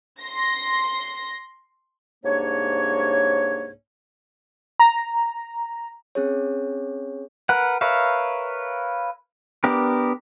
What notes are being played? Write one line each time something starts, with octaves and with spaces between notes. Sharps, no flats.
C6 A#6
C2 G#2 A#3 D4 C#5
A#5
C4 C#4 G#4 C#5
A#4 B4 F#5
A#4 B4 C#5 E5 F5
B3 D4 G4 A#4